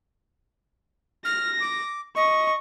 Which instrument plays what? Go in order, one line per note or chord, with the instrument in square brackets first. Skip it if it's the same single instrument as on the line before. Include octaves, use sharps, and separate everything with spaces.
[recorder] F6 [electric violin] A#6
[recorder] D6
[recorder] D#5 [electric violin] C#6